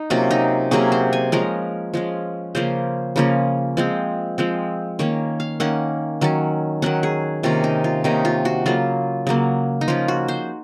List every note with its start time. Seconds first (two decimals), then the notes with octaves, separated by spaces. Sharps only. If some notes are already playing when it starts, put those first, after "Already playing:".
Already playing: D#4
0.10 C3 F#3 A#3 C#4 F4
0.31 D#4
0.71 C3 F#3 A#3 C#4 G#4
0.92 C5
1.13 G#5
1.32 F3 G#3 C#4 A#4
1.94 F3 G#3 C#4
2.55 C#3 F3 A#3 C#4 C5
3.16 C#3 F3 A#3 C#4
3.77 F3 G#3 C4
4.38 F3 G#3 C4
4.99 D#3 A#3 C#4 C#5
5.40 F5
5.60 D#3 A#3 C#4 F#5
6.21 D#3 F#3 C#4
6.82 D#3 F#3 C#4 F#5
7.03 G#4
7.43 C3 D#3 A#3 C#4 F4
7.64 D#4
7.84 F4
8.04 C3 D#3 A#3 C#4 D#4
8.25 F4
8.45 F#4
8.66 C#3 F#3 A#3 F4
9.27 C#3 F#3 A#3
9.81 D#4
9.88 F3 A#3 C#4 F4
10.08 F#4
10.28 C5